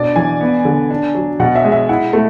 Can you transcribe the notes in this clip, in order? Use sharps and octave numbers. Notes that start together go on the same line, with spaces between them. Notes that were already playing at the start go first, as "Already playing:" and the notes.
Already playing: B2 D4 D5
E3 G#5
B3
D3
D4
F#3
B2 F#5
E5
G#3
E5
E4 F#5
A3